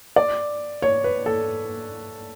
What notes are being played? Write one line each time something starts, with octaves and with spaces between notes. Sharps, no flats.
D5
C#5
B4
A4